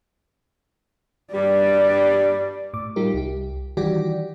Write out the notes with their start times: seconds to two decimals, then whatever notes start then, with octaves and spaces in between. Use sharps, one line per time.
1.34 G2 G3 D5
2.74 A2 D6
2.96 G3 D#4 F4 G4 A#4
3.14 C2 G4
3.77 D#3 E3 G3 F#4 G4 D5